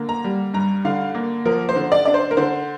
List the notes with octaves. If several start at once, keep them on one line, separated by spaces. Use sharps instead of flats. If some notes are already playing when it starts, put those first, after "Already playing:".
Already playing: D3 A#3
A#5
G3
G2 A#5
D3 F5
A#3
F3 A#4
C5
D3
D5
D4 D5
C5
A#4
D3 C5